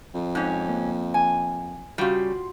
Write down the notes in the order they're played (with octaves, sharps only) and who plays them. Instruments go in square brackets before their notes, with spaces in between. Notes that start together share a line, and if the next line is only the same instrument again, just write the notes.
[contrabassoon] F2
[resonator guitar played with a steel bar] G#2 C#4
[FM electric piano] A#3
[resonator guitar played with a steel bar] G#5
[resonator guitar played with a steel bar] C#3 G3 [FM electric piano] F4 F#4 C6